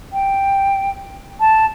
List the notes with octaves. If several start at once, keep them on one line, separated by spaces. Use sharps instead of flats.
G5
A5